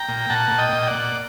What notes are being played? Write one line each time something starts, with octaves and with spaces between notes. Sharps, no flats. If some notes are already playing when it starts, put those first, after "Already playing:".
Already playing: G5 A#5
A#2
A#2 F#5 A5
A#2
D#5 G5
A#2
G5
D5 F#5
A#2